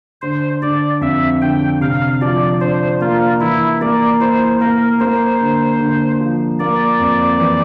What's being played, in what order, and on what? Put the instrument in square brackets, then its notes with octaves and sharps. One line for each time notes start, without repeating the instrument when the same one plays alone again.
[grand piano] D3 [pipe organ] C5
[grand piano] D3 [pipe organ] D5
[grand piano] F2 [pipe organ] E5
[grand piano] D3 [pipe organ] G5
[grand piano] C3 [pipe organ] F5
[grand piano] F3 [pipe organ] D5
[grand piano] D4 [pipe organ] C5
[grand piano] A#3 [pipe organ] F4
[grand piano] E3 [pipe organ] E4
[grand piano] A#3 [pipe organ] D5
[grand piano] E4 [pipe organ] C5
[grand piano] A#3 [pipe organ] A#4
[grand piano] A#3 [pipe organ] C5
[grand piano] D3
D3
F3
[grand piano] A#3 [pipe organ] D5
[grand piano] F2
E3